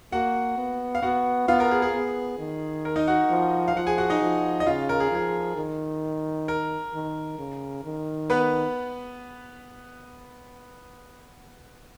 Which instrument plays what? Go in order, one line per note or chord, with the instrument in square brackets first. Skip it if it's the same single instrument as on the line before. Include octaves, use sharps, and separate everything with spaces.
[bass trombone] A#3 [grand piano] F#4 F#5
[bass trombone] B3
[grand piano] F5
[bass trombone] B3 [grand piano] F#4 F#5
[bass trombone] B3 [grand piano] F4 F5
[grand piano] A#4
G#4
G#4
[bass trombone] B3
D#3
[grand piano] A#4
D#4 D#5
F#4 F#5
[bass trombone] F3
[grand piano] F5
[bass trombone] F3 [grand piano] F#5
[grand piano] G#4 G#5
F#4 F#5
D#4 D#5
[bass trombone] F3
[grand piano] D#5
[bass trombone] C#3 [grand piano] F4 F5
[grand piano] A#4
G#4
[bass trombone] F3 [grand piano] G#4
[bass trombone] D#3
[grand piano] A#4
[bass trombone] D#3
C#3
D#3
[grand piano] B3 B4